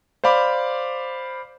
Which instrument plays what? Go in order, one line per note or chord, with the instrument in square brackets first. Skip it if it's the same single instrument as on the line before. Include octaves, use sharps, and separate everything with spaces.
[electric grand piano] C5 D5 F5 B5 D6